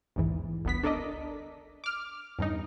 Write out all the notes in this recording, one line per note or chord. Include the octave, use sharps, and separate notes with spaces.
A#1 E2 G#2 E3
G1 C#2 B3 B6
D4 A4 A#4 D5 D#5
D6 F6
E2 G2 C#3 D#4